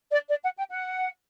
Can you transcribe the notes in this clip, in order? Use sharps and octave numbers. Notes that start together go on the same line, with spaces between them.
D5
D5
F#5
G5
F#5